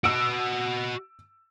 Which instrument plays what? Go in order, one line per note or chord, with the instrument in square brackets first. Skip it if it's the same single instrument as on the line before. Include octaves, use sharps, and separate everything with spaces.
[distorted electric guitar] F#4 D#5 [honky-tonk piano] E6 D7